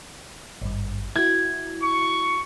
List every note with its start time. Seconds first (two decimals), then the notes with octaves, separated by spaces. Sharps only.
0.62 G#1 G2
1.15 E4 F#4 G#6
1.83 C#6